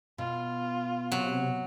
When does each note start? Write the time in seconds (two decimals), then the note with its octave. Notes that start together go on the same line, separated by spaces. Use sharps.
0.18 B2 F4
1.12 C3 F#3